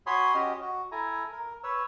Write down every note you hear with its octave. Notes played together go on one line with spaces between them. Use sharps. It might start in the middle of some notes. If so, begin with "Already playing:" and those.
F#4 C#5 G#5 B5 C6 D#6
C#4 F#4 G4 D#5
F#4
E4 A4 G#5 A#5
A#4
B4 C#5 E6